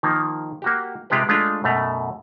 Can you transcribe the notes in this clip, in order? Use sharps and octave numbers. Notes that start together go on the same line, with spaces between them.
D#3 F3 A#3
A#3 F#4 G4
C3 G#3 F4 G4 B4
G#3 A3 D4 F4
F#2 B2 A3 A#5